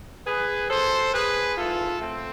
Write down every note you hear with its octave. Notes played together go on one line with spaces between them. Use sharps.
G#4 B4
B2 A4 C5
G#4 B4
G#2 E3 F4 A4
A3 C4